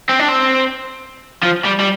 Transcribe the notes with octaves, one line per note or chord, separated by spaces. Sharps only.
C4
D4
C4
F3
G3
G3